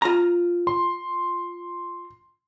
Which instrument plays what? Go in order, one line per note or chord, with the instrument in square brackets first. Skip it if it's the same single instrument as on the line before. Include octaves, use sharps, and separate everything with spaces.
[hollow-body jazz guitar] F4 A#5
[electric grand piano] C6